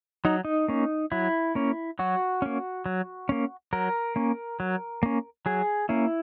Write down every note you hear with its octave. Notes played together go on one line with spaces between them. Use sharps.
F#3 D#4
D#4
A#3 C#4
F#3 E4
A#3 C#4
F#3 F#4
A#3 C#4
F#3
A#3 C#4
F#3 A#4
A#3 C#4
F#3
A#3 C#4
F#3 G#4
A#3 C#4 E4